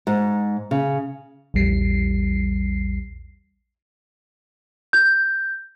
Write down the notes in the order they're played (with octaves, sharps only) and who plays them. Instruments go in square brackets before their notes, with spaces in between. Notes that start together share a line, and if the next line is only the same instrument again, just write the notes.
[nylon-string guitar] G#2
C#3
[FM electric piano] A#1 E2 G3 C7
[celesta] G6